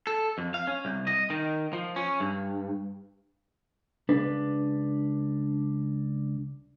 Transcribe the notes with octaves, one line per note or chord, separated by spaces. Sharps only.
A4
F2
F5
C#4
C2
D#5
D#3
F3
C#4
G2
C#2 D4 B4